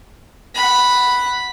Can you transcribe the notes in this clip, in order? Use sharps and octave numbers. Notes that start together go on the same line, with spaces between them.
F#5 B5